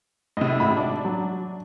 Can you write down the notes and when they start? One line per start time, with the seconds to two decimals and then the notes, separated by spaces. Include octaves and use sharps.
0.37 A2 C3 D#5
0.60 G#1 B5
0.77 D4
1.05 F#3